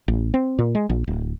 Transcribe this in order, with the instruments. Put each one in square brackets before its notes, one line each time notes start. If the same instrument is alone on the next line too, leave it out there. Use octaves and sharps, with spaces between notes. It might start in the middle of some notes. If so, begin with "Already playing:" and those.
[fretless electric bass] A1
C4
A#2
G#3
A#1
D1